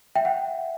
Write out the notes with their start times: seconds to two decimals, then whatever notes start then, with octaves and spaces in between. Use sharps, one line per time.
0.15 E5 G5
0.25 F#5